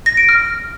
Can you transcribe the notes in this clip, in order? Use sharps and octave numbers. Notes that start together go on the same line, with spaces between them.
A#6
D7
F6